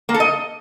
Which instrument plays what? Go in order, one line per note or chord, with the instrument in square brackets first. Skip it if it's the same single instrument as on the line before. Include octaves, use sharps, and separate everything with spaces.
[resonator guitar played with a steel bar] A#3
A4
D#5